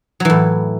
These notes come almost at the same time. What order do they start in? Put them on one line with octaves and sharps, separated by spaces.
F#3 E3 A2